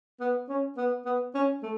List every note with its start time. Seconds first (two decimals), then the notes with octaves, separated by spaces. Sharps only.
0.21 B3
0.49 C#4
0.77 B3
1.05 B3
1.35 C#4
1.63 A3